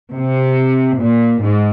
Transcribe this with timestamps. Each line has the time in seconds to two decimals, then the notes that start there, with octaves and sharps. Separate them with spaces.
0.14 C3
0.99 A#2
1.42 G#2